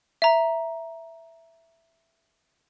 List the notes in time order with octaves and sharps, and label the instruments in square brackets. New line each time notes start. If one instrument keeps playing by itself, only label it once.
[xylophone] E5 A#5